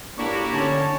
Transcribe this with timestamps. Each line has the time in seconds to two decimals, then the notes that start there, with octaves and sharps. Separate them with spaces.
0.18 A2 A#3 D4 E4 F#4 G4 C#6
0.53 D3 C#4 C#5 A5